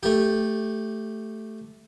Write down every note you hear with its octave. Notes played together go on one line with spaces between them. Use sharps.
A3 G4